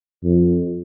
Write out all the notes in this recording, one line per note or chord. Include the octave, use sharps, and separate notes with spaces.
F2